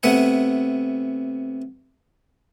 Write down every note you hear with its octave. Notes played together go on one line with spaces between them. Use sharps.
C3 A3 B3 F#5 G#5